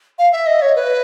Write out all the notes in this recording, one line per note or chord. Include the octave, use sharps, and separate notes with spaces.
F5
E5
D#5
C#5
B4